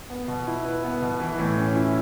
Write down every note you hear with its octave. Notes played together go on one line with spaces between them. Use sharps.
B3
B2
E4
B4
B3
B2
E3
A2
C#4
E4